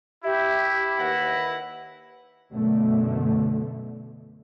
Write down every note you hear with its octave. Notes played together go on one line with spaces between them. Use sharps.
E4 G4 E5
D#2 B4 F#5 A#6
F#2 B2 D3 A3